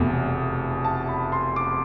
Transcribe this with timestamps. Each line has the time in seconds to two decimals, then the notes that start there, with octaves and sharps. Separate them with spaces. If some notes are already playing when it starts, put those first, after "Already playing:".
Already playing: F1 E2 B2 A3
0.84 A5
1.09 B5
1.32 C6
1.56 D6